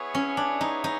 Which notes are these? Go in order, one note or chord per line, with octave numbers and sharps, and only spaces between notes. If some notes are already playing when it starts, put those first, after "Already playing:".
Already playing: B3 E4 G#4 C#5
C#4
D4
D#4
D#4